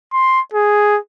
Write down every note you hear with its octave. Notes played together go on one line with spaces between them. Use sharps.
C6
G#4